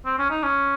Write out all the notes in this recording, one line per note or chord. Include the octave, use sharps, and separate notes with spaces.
C4
C#4
D#4
C#4